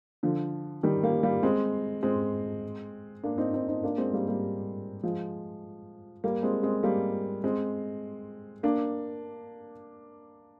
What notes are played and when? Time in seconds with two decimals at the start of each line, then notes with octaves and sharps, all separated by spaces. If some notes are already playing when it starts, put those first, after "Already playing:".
0.23 D3 F3
0.83 D#3 G3
1.03 G3 A#3
1.23 G3 A#3
1.43 G#3 C4
2.03 G#3 C4
3.24 A#3 D4
3.38 C4 D#4
3.53 C4 D#4
3.69 C4 D#4
3.83 A#3 D4
3.98 G#3 C4
4.13 G3 A#3
4.28 G3 A#3
5.03 F3 G#3
6.24 G3 A#3
6.43 G#3 C4
6.63 G#3 C4
6.83 G3 A#3
7.44 G#3 C4
8.63 A#3 D4